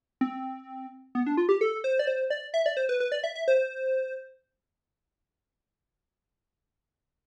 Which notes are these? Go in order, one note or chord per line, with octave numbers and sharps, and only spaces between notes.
C4
B3
D4
F4
G4
A4
C5
D5
C5
D5
E5
D5
C5
B4
B4
D5
E5
E5
C5